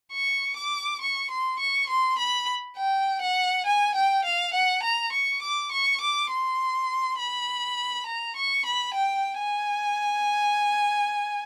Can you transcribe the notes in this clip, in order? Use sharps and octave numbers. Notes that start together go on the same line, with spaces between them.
C#6
D6
C#6
C6
C#6
C6
B5
G5
F#5
G#5
G5
F5
F#5
A#5
C#6
D6
C#6
D6
C6
B5
A#5
C#6
B5
G5
G#5